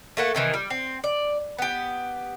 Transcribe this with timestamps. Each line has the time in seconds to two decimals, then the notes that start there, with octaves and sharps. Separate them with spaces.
0.17 A3 A#3 F#5
0.35 C3 D#3 E3
0.54 G3
0.70 C4
1.04 D5
1.59 B3 G4